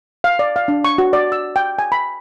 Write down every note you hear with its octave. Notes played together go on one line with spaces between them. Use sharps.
F5
D5
F5
D4
C#6
F#4
D5
E6
G5
G#5
B5